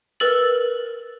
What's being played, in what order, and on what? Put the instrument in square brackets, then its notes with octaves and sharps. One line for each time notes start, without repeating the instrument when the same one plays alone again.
[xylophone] A#4 B4 E6 A6 F#7